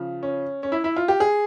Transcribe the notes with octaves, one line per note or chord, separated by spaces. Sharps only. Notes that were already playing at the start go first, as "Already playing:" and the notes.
Already playing: C#3 F3
C#4
C#4
E4
E4
F4
G4
G#4